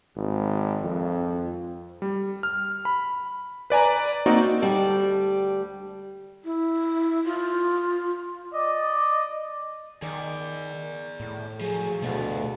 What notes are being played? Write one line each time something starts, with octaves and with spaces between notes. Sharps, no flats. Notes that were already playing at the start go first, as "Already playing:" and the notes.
G#1
F2
G3
F6
B5
B4 D5 G#5 A#5
A#3 C4 D#4 F#4 D5
D2 G3 G5 A5
E4
F4
D5 D#5
D#3 G#4 D5
A2
F3 F#3 G#4
D2 B2 A3 F4